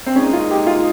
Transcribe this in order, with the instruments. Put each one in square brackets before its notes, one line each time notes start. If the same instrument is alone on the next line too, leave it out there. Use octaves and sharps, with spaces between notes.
[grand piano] C4
[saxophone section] A#2 G#3 D#4 [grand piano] C#4
[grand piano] F4
G4
F4